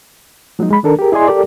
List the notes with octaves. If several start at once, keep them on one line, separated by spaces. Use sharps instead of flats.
F3 F#3 G#3 A#3 D#4
G#3 B5
D#3 D4 A4 A#4
G4 G#4 A#4
E4 G#4 D5 D#5 G#5 C6
G4 A4 A#4 D5